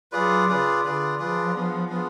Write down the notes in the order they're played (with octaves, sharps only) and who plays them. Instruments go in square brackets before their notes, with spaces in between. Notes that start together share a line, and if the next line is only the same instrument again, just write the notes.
[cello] F#3 [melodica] F4 G#4 B4 D5
[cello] C#3 [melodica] F4 G#4 B4 D5
[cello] D3 [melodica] F4 G#4 B4 D5
[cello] F3 [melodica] F4 G#4 B4 D5
[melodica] B3 D4 F4 G#4
B3 D4 F4 G#4